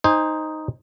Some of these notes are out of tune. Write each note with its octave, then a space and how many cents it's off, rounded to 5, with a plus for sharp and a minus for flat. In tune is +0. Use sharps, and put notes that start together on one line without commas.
D#4 +0 C5 +0 G#5 -25